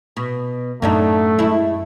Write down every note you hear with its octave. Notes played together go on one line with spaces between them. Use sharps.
B2
F#2 A2 F#3 A3 D4 D#4
F#2 G#3 E4